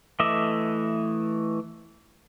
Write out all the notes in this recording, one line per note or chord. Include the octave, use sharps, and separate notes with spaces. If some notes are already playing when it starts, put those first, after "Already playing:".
E3 A3 D#5 E5 D6